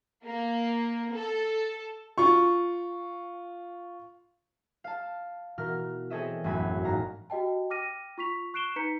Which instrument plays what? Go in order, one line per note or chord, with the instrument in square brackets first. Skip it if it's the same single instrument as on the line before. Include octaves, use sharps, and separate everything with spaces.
[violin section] A#3
A4
[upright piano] F4 C#6
[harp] F5 A5
B2 E3 A#4 F6
C4 G#4 A4 C#5 D#5 E5
E1 A1 F#2 G#5 B5
G#2 F5 A#5
[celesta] F#4 G4 D#5 G5 A5
G5 D6 F6 A#6 D#7
F4 C#6 B6 F7
C#6 F#6 C7 D7 E7 G7
D#4 B4 A#5 G6 B6 C#7